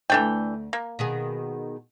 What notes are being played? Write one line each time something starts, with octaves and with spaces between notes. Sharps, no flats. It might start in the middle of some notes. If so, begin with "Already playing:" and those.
D2 E3 A3 D4 G5
A#3
B2 D#3 G#4